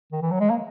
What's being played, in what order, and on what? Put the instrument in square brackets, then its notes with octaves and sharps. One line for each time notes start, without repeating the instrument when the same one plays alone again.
[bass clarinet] D#3
E3
F#3
G#3
A#3